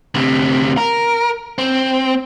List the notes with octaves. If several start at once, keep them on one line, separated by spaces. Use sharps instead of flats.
D2 C3
A#4
C4